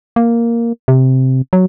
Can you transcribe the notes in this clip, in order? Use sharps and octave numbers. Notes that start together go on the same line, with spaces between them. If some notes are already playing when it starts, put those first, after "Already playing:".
A#3
C3
F#3